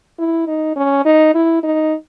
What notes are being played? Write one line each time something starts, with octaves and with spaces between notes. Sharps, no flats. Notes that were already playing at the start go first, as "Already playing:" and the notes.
E4
D#4
C#4
D#4
E4
D#4